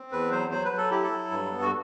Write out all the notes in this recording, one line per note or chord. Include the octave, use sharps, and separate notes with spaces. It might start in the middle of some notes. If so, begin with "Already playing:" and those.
Already playing: C4
E2 B4
F#3 C5
F#3 C5
B4
F#3
A4
E4 G4
A4
F#3
G2
B3
F#4